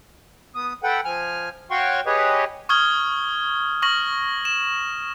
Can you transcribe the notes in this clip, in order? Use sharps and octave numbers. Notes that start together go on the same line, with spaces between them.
B3 D#6
A4 B4 F#5 G5
F3 G#5 F6
F#4 C#5 F5 G5 C6 C#6
G4 G#4 B4 C#5 D#5
C#6 D#6 F6 G#6 G7
C#6 F6 A#6 F#7
E7